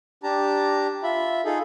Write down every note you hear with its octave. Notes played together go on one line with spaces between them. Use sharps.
D4 G4 A5 A#5
F4 E5 B5
D#4 F4 G#4 A4